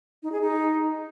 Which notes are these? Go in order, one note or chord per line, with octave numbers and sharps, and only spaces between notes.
D#4
G#4
D#4